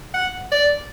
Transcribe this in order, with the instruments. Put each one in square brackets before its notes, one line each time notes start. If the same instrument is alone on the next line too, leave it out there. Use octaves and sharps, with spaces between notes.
[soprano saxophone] F#5
D5